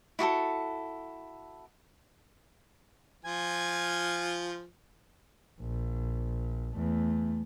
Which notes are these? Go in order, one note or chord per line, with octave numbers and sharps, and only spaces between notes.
E4 F#4 G#4 A4
F3 F4 G#5
A#1
E2 A3